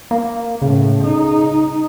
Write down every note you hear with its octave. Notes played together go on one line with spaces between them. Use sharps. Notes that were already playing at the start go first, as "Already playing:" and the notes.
A#3
A2 C#3
D#4